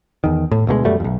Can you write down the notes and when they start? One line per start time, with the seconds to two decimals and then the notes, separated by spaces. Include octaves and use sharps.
0.24 E2 D#3
0.51 A2
0.67 D2 B2 F#3 G#3
0.85 F#2 F#3 G3 A3
1.00 B1 F2